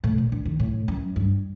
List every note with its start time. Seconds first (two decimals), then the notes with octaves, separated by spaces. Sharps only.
0.04 A2
0.18 A#2
0.32 D3
0.45 D#3
0.59 A2
0.88 F#2
1.16 G2